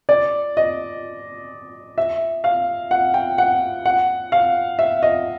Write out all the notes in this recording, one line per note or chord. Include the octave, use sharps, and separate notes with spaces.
D5
D#5
E5
F5
F#5
G5
F#5
F#5
F5
E5
D#5